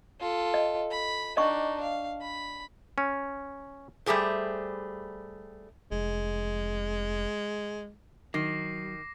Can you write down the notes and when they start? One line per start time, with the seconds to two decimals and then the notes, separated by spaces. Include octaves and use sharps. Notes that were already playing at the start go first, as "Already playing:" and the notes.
0.20 F4 A4
0.54 D#5
0.91 B5
1.37 D4 D#4 D#5 G5 C#6
1.81 F5
2.22 B5
2.98 C#4
4.06 G3 A3 G4 G#4 C5
5.91 F1 G#3
8.34 D#3 F#3 D6 A#6 C7